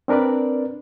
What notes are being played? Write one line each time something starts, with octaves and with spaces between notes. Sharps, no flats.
C4 D4 A#4 B4 D5